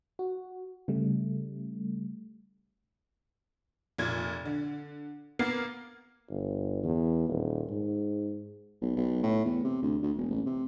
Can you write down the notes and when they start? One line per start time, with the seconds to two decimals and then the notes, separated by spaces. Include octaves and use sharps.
0.19 F#4
0.88 C#3 G3 A3
3.98 F1 A#2 G#6
4.45 D3
5.39 A#3 B3 F6 C7
6.30 G1
6.83 E2
7.29 D#1
7.70 G#2
8.82 B1
8.97 B1
9.23 A2
9.45 E2
9.64 C3
9.83 D2
10.03 D2
10.17 E1
10.30 A1
10.46 C3